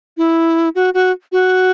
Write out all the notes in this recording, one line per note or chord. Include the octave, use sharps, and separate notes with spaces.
E4
F#4
F#4
F#4